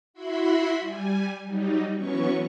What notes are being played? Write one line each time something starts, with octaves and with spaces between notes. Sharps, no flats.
E4 F#4 E5 B5 C6
G3 G#5
F#3 G3 D#4
E3 F#3 B3 C#4 C#6